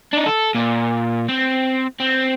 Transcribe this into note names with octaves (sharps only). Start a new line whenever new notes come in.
D4 D#4
A4
A#2
C4
C4